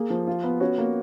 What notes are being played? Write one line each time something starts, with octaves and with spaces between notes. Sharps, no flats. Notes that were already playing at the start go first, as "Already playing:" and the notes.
Already playing: A#3 G#4
F3
F4
B3
C#4 F#4
A#3